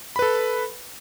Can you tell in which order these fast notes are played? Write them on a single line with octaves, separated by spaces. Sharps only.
B5 B4 A4